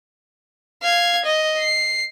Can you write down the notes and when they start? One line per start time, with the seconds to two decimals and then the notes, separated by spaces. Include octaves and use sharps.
0.83 F5 G#6
1.25 D#5
1.58 C7